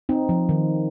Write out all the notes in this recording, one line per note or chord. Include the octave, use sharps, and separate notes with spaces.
C4 D#4
F3
D#3